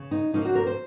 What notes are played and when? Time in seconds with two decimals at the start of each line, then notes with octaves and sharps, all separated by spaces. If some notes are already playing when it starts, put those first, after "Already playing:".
Already playing: C#3
0.11 D#4
0.33 C#3 F3 A#3 C#4 D#4
0.45 F#4
0.55 A#4
0.67 C5